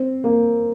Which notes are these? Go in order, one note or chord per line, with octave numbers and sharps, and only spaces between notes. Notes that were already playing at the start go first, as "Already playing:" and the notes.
Already playing: C4
A#3